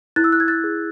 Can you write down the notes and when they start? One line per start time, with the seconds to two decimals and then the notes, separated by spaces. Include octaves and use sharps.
0.16 E4 F#6 A6
0.24 E6
0.32 F#6
0.40 G#6
0.48 F#6 A6
0.64 G#4